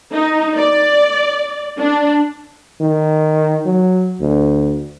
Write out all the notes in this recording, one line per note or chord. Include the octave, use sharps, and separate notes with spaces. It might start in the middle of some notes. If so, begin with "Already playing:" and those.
D#4
D5
D4
D#3
F#3
D2